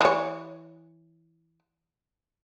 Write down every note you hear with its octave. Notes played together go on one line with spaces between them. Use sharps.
E3 C#5